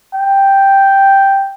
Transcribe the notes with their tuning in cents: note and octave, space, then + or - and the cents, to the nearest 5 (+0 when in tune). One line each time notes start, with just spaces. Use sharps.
G5 +0